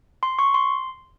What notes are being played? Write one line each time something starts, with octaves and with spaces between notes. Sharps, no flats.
C6
C#6
C6